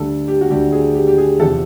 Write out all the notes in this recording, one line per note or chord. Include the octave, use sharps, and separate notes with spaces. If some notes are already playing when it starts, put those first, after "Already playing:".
Already playing: D2 D3 G3 A4
G4
F#4
D2 D3 G3 G4
G#4
G4
G4
G#4
E2 C3 F3 A4